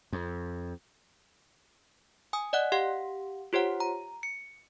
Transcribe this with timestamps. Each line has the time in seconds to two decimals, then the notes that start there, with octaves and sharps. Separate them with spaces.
0.13 F2
2.33 G#5 D#6
2.53 D5 D#5 F#5 F#6
2.72 G4 F5 F#5
3.53 F4 G4 C5 C#5 F#5
3.80 A#5
4.23 C#7